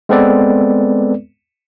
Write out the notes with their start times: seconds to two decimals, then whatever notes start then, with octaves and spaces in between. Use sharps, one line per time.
0.09 G#3 B3 C4 A4 B4 D5